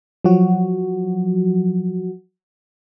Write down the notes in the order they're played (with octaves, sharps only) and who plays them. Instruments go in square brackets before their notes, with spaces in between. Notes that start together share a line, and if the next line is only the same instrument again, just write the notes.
[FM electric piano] F3 F#3 F#4